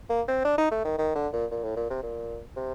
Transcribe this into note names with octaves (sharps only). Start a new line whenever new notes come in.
A#3
C4
D4
D#4
A3
D#3
D#3
D3
A#2
A#2
A2
A#2
C3
A#2
C3